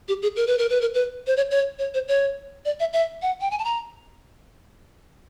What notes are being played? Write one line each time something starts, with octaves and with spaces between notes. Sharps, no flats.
G4
G#4
A#4
B4
A#4
B4
A#4
B4
C5
C#5
C#5
C#5
C5
C#5
D5
E5
E5
F#5
G5
G#5
A5
A#5